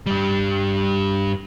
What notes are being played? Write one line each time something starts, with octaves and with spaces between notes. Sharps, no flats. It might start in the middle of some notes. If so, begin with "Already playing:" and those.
G2 G3